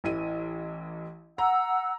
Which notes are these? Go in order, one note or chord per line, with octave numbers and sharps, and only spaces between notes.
A1 E3 D#7
F#5 A#5 E6